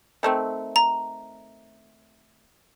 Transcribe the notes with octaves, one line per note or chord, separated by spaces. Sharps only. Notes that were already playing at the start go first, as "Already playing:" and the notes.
D#3 A3 C4
A#5